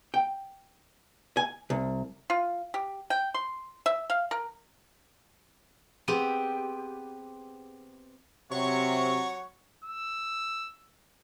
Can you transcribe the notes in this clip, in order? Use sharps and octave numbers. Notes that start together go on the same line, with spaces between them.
G5
G#5
C2
F4
G4
G5
C6
E5
F5
A#4
B3 C4 G4 G#4 D#7
C3 F#3 C#5 F#5 C#6
E6